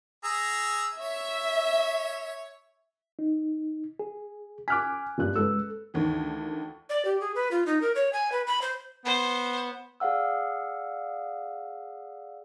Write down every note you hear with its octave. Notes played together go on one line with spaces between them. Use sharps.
G#4 A#5 E6
C#5 E5
D#4
G#4
G#5 D6 F6 F#6 B6
F#1 G2 F#6
G#3 A4 B4 E6
D2 D#3 E3
D5
G4
G#4
B4
F4
D#4
A#4
C#5
G#5
B4
B5
C5
B3 C5
G#4 D5 F5 F#5 E6